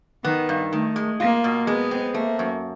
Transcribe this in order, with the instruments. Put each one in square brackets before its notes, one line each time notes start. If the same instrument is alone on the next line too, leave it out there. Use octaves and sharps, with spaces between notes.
[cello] D#3 [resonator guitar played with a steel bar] B3
[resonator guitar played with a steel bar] G2
[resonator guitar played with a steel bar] D#3 [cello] A3
[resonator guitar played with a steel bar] G#3
[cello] A#3 [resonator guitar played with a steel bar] F4
[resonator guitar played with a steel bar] B2
[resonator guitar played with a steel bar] G#3 [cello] B3
[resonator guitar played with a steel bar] C4
[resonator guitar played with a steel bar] A3 [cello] A#3
[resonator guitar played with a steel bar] F#2